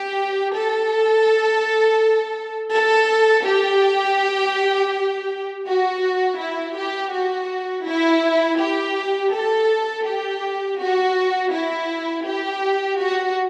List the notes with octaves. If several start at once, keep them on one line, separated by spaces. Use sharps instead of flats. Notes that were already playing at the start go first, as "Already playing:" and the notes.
Already playing: G4
A4
A4
G4
F#4
E4
G4
F#4
E4
G4
A4
G4
F#4
E4
G4
F#4